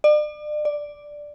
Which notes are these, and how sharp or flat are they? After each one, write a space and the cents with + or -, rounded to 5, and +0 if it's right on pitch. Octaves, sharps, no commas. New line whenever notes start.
D5 +40
D5 +0